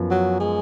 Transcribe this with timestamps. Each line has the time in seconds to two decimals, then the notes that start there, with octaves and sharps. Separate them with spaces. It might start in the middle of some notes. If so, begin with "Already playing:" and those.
Already playing: F#2 F3 B3
0.10 F#3
0.40 G#3